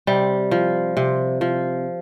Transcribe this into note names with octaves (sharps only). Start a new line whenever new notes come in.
C3 G3
F3
C3
F3